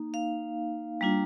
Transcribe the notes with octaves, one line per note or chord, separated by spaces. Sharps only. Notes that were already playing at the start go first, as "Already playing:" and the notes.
Already playing: A#3 D#4
F5
G3 A#3 D4 F4